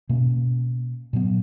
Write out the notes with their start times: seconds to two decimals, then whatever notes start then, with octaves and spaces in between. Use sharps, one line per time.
0.09 B2 A#3 C#4
1.13 A#2 F#3 B3